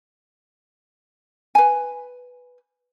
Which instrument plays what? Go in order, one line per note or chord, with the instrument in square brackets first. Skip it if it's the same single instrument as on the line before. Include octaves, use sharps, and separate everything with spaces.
[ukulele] B4 G#5